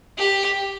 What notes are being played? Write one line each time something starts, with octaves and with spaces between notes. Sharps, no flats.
G4